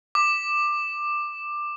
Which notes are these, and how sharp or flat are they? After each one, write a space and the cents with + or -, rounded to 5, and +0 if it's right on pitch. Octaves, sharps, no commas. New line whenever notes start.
D6 +15